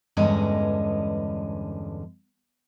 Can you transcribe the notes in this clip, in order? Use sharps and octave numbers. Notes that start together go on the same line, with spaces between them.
E2 G2 D3 G#3 C#4 D#5